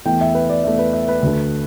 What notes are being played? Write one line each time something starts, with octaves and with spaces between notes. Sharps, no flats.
E2 E3 A3 G5
E5
B4
D5
E2 E3 A3 E5
B4
E5
B4
D2 D3 A3